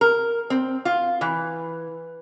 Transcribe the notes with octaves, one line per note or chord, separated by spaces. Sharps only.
A#4
C4
F4
E3